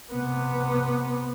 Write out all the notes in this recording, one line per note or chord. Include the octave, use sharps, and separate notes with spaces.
C3 B3